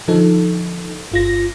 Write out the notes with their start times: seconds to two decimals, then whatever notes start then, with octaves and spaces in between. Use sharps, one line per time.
0.08 D3 F3 D#4 A4
1.12 G1 F4 A#6